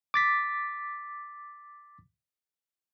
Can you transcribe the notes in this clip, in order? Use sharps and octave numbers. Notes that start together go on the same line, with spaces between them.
D6 A6 B6